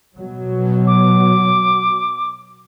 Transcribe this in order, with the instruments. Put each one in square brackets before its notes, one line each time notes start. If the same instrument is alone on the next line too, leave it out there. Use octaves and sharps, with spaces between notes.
[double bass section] B2 F#3
[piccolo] D6